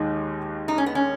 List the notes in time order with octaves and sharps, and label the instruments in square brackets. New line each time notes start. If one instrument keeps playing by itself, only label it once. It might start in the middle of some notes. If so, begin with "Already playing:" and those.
Already playing: [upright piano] D#2 D#3 G#3 D#4
[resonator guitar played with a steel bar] D#4
C#4
B3
C#4